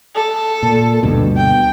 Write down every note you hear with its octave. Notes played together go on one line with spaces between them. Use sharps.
A4
A#2
D2 G2 B2
G5